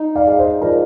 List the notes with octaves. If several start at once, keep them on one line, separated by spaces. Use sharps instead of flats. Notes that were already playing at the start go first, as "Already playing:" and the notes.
Already playing: D#4
D5 F5
G#3 F5
C5 D#5
F3 A#4 D5